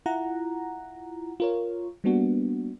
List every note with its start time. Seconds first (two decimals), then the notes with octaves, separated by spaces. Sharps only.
0.06 E4 F4 F#5 A#5
1.40 F4 A#4 C#5
2.04 G3 A#3 B3 D4 F#4